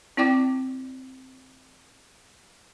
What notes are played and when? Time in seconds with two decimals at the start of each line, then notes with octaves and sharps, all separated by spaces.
0.17 C4 E4 D5 G5 D6